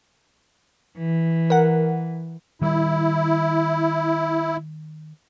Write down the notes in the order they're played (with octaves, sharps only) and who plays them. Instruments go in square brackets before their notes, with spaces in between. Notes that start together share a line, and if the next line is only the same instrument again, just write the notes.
[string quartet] E3
[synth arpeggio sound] A#4 F#5
[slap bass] D#3 G3 [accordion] E4